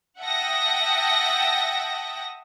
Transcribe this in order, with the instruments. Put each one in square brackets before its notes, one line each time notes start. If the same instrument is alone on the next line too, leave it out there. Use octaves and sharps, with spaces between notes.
[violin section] E5 F#5 G5 A5 D#6 A#6